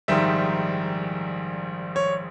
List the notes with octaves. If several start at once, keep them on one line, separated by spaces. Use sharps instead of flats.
A#1 G#2 D#3 G3 E5
C#5